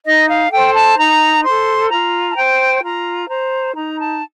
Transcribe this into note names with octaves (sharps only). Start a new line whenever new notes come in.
D#4 D#5
F5
A4 C5 G5
A5
D#4 A#5
A4 C5 C6
F4 A#5
A5
C5 G5
F4 A#5
C5 A#5
D#4 A#5
A5